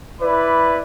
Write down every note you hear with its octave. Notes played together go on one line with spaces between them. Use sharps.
E4 B4 D5 B5